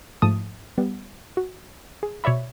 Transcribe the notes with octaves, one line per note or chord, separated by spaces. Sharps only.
G#2 F3 A3 A5 D#6
G3 B3
F#4
G#4
B2 C#5 D5 E5 B5